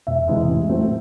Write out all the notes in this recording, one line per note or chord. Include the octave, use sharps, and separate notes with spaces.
E1 E5
E2 C3 E3 G#3
A1
A2 F#3 A3 C4